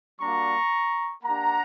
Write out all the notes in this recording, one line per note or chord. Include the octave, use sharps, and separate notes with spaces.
G3 A#3 D4 F#4 A#5 C#6
A#3 D4 G4 F#5 A#5